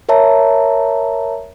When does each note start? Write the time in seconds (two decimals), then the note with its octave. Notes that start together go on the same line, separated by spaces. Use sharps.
0.09 A#4 C#5 E5 A5 A#5